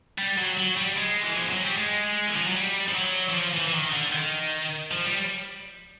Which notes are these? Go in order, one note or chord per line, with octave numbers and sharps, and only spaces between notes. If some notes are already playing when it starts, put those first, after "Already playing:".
G3
F#3
F#3
G3
G#3
E3
F3
F#3
G3
G#3
E3
F3
F#3
G3
F3
F#3
E3
F3
E3
E3
D#3
D3
D#3
F3
G3